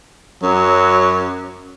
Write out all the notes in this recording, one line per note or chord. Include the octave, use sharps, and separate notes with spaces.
F#2 F#3